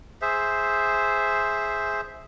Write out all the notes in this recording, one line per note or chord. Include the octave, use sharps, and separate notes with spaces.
G#4 C5 E5